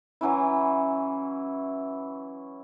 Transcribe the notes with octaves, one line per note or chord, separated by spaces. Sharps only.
E3 F#3 C#4 E4